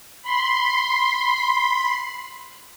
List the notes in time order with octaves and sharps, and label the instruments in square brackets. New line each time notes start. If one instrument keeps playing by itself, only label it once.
[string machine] B5 C6